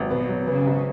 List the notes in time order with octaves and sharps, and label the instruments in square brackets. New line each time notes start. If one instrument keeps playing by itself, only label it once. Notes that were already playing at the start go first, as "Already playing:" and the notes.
Already playing: [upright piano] G#1 F#3 B3
[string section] B2 [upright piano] B3
[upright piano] F#3
[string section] C#3 [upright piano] B3
[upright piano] G#1